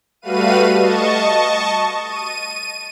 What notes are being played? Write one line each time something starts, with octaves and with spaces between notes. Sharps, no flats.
G3 A3 F#4 B4 F5 D#7
D#5 A5 C#6
D#7